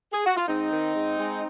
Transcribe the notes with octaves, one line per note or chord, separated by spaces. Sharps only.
G#4
F#4
F4
G#2 C4 D#4
D#3
G#2
G#3